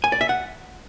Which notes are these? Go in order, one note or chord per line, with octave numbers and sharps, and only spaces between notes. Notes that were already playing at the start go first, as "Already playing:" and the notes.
G#5
D5
E5
F#5